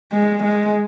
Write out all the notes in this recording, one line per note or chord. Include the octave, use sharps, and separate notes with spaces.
G#3
G#3